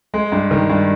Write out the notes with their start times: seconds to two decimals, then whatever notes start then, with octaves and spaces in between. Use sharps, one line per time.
0.14 G#3
0.32 G2
0.51 D#3
0.70 G2